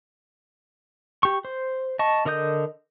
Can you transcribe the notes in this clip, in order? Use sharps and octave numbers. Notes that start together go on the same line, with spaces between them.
G4 C#6
C5
D#5 A5 C#6
D3 A#4 D#5 D#6 G6